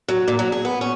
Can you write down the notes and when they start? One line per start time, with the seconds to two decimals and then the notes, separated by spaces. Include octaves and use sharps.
0.08 F#3
0.28 A#2
0.39 F#3
0.52 G#4
0.65 B3
0.81 C#4